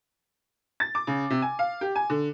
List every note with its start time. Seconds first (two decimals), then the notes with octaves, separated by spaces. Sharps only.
0.80 A6
0.95 D6
1.07 C#3
1.30 C3
1.42 G#5
1.59 F5
1.81 G4
1.96 G#5
2.10 D3